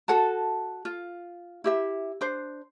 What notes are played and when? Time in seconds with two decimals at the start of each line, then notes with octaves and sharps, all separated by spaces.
0.08 F#4 A4 F#5 A5
0.85 F4
1.64 E4 G4 E5
2.21 D4 C5